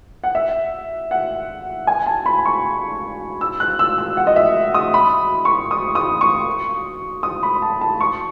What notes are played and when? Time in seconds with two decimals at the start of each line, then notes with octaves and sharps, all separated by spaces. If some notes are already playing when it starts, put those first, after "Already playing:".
0.24 F#5
0.35 E5
1.11 F#5
1.87 G#5
2.06 A5
2.26 B5
2.45 C#6
3.41 E6
3.60 F#6
3.79 E6
3.98 E6
4.17 F#5
4.27 D#5
4.36 E5
4.74 D#6
4.94 B5
5.45 C#6
5.71 D#6
5.95 D#6
6.21 C#6
7.23 D#6
7.43 B5
7.62 A5
7.81 A5
8.01 C#6